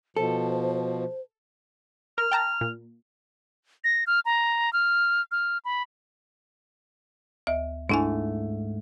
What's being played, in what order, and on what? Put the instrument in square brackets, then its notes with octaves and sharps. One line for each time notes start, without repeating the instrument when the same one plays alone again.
[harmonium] B2 F3 [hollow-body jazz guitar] A4 [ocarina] C5
[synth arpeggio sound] A#4 [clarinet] F6
[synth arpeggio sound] G5 A5 A#5
A#2
[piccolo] A#6
F6
A#5
F6
F6
B5
[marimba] D2 E5
[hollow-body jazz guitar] G#2 A3 [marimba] D4 E4 G#5